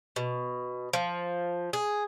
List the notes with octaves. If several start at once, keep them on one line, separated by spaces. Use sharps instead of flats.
B2
F3
G#4